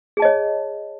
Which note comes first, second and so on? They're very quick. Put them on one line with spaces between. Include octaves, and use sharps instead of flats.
G#4 A5 D#5 C#5